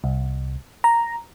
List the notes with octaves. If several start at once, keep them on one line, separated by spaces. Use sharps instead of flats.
C2
A#5